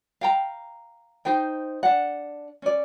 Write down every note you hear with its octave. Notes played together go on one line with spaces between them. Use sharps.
F5 G5 A#5
D#4 C5 G5
D4 F#5
C#4 D5